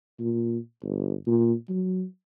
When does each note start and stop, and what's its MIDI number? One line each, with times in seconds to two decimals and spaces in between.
0.20 0.58 46
0.83 1.13 31
1.27 1.53 46
1.69 2.04 54